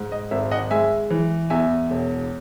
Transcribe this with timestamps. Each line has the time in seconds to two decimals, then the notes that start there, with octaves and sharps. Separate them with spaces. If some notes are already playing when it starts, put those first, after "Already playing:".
Already playing: G#2
0.12 D#5
0.31 G#1 E5
0.51 D#5 F#5
0.71 G#3 E5 G#5
1.10 E3
1.50 E2 E5 G#5
1.90 E1